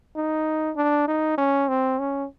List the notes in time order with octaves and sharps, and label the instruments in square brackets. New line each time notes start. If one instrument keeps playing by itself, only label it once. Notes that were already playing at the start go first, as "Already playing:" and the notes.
[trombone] D#4
D4
D#4
C#4
C4
C#4